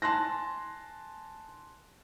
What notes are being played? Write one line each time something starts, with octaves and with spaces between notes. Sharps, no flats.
G#5 A5 C6 F#6 A#6